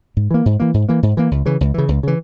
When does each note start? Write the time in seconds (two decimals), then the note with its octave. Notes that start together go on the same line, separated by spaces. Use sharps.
0.17 G#2
0.31 E3 A#3
0.46 G#2
0.60 E3 A#3
0.74 G#2
0.89 E3 A#3
1.03 G#2
1.17 E3 A#3
1.31 C#2
1.46 C#3 E3
1.61 C#2
1.74 C#3 E3
1.88 C#2
2.03 C#3 E3